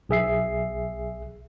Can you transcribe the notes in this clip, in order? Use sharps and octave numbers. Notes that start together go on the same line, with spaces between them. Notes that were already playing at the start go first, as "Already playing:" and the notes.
B1 G#4 E5 C7